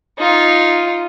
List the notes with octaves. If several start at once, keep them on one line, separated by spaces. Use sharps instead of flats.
D#4 F4